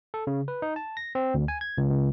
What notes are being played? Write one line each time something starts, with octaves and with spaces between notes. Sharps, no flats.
A4
C#3
B4
D#4
A5
A#6
C4
D2
G#5
G#6
C#2
C#2